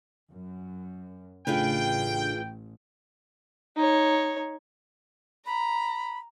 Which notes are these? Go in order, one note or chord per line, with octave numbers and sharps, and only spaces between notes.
F#2
A1 C#3 A3 D4 F4 G#4 B4 G5
D#4 C#5
A#5 B5